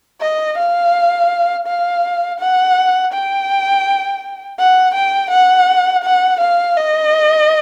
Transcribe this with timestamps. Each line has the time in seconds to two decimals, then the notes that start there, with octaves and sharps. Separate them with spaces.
0.21 D#5
0.58 F5
1.67 F5
2.40 F#5
3.12 G5
4.59 F#5
4.94 G5
5.31 F#5
6.03 F#5
6.40 F5
6.77 D#5